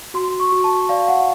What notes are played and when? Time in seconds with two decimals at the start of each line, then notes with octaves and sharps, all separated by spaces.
0.14 F#4 C6
0.40 C#6
0.52 F#4
0.64 A5
0.89 D5 F5
1.08 F#5